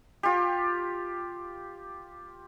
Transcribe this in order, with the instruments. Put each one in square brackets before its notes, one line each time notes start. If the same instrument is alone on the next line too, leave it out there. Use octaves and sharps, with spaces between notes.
[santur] F4 G4